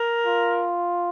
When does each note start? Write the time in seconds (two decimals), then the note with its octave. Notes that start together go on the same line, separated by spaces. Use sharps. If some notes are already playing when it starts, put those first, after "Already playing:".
Already playing: A#4
0.27 F4